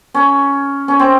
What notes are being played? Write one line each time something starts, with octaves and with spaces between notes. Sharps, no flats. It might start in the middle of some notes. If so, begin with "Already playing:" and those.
C#4
C#4
C4